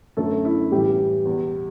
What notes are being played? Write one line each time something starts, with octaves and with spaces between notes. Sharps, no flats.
F#2 D3 A3 A4
E4
A2 E3 G3 G4
E2 B2